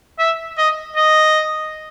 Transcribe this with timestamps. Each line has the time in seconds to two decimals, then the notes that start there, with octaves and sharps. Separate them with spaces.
0.19 E5
0.58 D#5
0.96 D#5